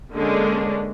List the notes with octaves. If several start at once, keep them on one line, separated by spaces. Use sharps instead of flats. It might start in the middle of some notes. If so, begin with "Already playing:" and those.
D3 G#3 A#3 C#4 D4